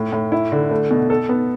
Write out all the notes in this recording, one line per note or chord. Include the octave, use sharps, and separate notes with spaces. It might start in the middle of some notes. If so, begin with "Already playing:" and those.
Already playing: A2
A2
E4
D3
A3
B2
A4
B3